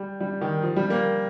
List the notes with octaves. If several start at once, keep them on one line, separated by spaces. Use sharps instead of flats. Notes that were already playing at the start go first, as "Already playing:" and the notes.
Already playing: G3
G3
D#3
F3
G3
A#3